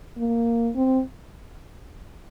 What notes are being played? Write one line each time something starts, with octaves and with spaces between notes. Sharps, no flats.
A#3
C4